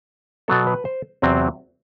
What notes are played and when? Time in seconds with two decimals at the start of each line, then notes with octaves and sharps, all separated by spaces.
0.48 B2 F#3 B3 A4
0.67 B4
0.85 C5
1.22 E2 C3 F#3 C4